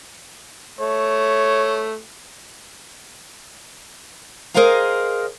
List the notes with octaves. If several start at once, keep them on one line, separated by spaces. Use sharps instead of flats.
A3 C#5
G#4 A#4 C5 D#5 F5 A#5